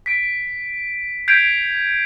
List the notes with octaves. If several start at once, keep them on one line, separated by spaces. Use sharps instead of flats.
B6 D7
G6 G#6 B6 C7 D7 F7